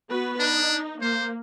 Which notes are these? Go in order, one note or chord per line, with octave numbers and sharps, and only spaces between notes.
B3 F#4 B4
D4 D#4
A#3 C5